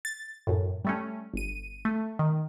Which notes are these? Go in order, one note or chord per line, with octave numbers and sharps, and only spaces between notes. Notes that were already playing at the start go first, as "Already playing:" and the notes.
A6
F#2 A2
G3 A3 C#4
G1 D#7
A3
D#3